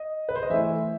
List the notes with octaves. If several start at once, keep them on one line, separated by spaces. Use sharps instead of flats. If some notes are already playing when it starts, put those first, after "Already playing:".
Already playing: D#5
B4
C5
D#5
E3 A3 E4 E5